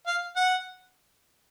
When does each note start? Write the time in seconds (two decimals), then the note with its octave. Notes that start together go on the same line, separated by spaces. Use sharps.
0.07 F5
0.36 F#5